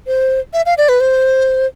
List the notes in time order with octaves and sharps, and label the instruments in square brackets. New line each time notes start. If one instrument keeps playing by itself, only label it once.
[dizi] C5
E5
F5
D5
B4
C5